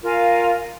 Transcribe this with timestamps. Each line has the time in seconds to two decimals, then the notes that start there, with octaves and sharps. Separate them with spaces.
0.02 F4 A#4 F5 G#5